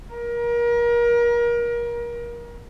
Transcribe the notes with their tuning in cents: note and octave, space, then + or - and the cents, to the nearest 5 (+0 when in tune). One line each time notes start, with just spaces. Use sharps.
A#4 +30